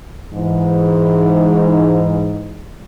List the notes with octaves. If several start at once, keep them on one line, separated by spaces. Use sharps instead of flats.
G#2 E3